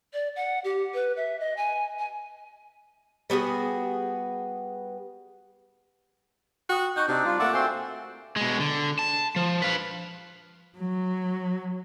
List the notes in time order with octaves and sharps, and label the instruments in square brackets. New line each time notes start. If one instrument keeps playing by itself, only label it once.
[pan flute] D5
F#5
G4
B4
E5
D#5
G#5
G#5
[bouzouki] G3 B3 F#4 G#4
[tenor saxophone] F#4 [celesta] G5 D#6
[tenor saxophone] D#4 [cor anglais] F#4 [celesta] C#6 G6
[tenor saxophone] C3 [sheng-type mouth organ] C4 D#4 [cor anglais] D4
[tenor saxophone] G3 [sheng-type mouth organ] F4
[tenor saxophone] A3 [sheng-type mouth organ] A#3 F#5 [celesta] D6 A6 D7
[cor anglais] C4 [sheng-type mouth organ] F#4 C6 [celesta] E5 G5 G#5
[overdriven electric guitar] B2 G#3
D3
A5
F3
B4 F5
[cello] F#3